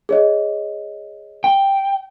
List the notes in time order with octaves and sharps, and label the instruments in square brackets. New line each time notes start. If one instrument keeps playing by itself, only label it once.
[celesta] G#4 C#5 D#5
[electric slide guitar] G5